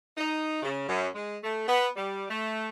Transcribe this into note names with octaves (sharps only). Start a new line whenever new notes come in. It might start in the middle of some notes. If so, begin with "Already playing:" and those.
D#4
C#3
F#2
G#3
A3
B3
G3
A3